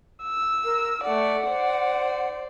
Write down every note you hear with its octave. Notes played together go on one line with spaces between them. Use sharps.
E6
A#4
A3 D5 F#5
C5 D5